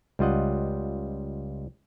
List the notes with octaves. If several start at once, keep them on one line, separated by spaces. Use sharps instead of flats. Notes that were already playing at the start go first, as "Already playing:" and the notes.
C#2 G3 F4 D#5 F#5